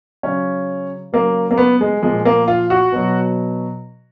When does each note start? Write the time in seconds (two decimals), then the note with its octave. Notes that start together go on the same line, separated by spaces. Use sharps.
0.23 C#3 F#3 C#4
1.13 C#3 F#3 A#3
1.51 A#3
1.58 B3
1.81 G#3
2.03 A#2 F3 G#3
2.25 A#3
2.48 F4
2.70 F#4
2.92 B2 F#3